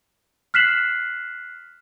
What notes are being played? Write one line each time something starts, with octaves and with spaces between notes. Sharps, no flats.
F6 F#6 B6 C7 E7 F#7